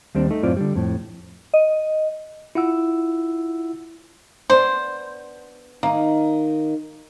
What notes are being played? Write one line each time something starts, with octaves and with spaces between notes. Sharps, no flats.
D#2 G3 C4 D4
A3 D#4
F#2 A2 C4 F4 D5
D3 G3
F2 A2
D#5
E4 F4 F#5 E6
B3 D4 C5
D#3 A#3 D#4